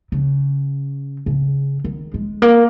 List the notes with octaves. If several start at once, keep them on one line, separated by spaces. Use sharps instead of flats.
C#3
C#3
D#3
G#3
A#3